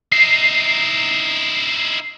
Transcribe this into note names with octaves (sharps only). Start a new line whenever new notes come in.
D#4 E4 C7